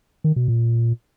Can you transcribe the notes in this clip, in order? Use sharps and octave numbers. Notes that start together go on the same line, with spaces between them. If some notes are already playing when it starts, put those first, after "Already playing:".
D#3
B2
A#2